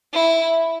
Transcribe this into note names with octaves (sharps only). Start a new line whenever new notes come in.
E4